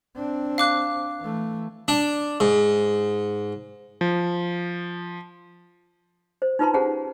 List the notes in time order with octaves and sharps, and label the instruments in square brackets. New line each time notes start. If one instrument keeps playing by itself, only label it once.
[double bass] C4 D4
[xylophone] F5 D6 F#6
[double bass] E3 A3
[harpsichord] D4
G#2
[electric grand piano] F3
[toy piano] C5
D#4 F4 B4 A5 A#5 C6
C#4 G4 G#4 C5 F#5 A#5